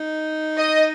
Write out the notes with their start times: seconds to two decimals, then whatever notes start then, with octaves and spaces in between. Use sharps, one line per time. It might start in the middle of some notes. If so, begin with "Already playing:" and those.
Already playing: D#4
0.58 D#5